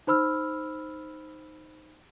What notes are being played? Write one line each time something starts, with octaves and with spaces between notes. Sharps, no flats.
D#4 C5 B5 E6 F6